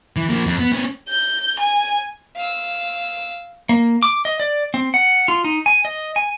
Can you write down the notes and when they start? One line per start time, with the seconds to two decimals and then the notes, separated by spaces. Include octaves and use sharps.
0.16 E3
0.29 F3 A#3
0.46 F2
0.59 B3
0.72 B3 C#4
1.09 G6
1.59 G#5
2.36 F5 E6
3.69 A#3
4.03 D6
4.25 D#5
4.40 D5
4.74 C4
4.94 F#5
5.28 F4
5.44 D#4
5.66 G#5
5.85 D#5
6.16 G#5